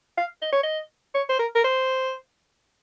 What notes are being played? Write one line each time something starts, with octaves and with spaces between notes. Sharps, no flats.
F5
D#5
C#5
D#5
C#5
C5
A#4
A#4
C5